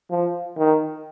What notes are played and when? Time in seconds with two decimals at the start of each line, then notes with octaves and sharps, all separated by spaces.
0.11 F3
0.58 D#3